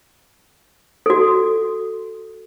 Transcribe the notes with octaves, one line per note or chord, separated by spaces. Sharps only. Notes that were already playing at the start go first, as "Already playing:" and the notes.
F#4 A4